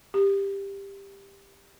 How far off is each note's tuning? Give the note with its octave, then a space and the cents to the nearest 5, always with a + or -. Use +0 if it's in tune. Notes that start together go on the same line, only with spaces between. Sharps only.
G4 +10